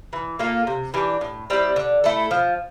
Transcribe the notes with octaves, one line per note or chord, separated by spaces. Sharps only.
E3
A#3 F4 A4
C3
E3 G3 D4
A2
G3 C4 E4
D3
A3 E4 A4
F3